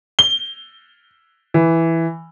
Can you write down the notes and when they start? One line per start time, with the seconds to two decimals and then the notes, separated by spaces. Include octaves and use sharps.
0.19 G7
1.54 E3